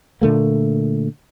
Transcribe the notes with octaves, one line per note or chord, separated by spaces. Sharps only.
A#2 D3 A3 A#3